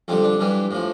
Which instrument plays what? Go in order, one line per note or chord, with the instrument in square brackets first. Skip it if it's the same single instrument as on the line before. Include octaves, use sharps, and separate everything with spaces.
[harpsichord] F2 D3 G3 C4
D4
G2 E3 G3
A2 F3